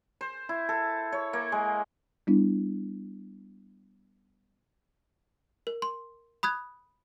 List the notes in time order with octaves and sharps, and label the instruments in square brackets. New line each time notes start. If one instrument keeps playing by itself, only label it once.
[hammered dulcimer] C5
E4
A4
C#5
A#3
G#3
[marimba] G3 B3 D4 E4
[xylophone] A#4
C6
B5 D#6 F#6 G#6